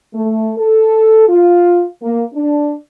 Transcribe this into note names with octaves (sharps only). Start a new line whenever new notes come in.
A3
A4
F4
A#3
D4